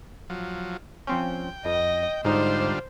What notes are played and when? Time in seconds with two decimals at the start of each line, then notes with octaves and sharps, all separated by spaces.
0.30 F3 F#3
1.07 F3 C4 C#4 G5
1.65 F2 D#5
2.24 G#2 D3 G3 D#4 F4 C5